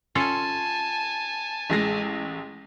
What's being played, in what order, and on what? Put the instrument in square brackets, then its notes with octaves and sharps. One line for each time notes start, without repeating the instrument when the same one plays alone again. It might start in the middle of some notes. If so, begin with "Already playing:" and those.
[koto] C#4 F4 A4 [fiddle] G#5 A5
[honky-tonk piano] A1 G#3 A#6